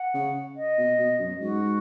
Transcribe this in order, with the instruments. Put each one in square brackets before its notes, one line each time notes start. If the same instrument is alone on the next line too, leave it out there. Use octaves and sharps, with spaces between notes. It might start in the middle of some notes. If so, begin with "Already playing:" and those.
Already playing: [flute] F#5
[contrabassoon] C#3
[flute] D#5
[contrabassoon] B2
B2
F#2
[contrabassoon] G#2 [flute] F#4